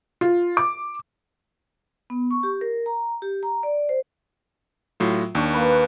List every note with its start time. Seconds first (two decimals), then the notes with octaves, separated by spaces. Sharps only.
0.21 F4
0.57 D6
2.10 B3
2.31 C#6
2.43 G4
2.61 A#4
2.86 A#5
3.22 G4
3.43 A#5
3.63 D5
3.89 C5
5.00 A2 F#3 F4
5.35 D#2 D4 C#6
5.53 A#3 B4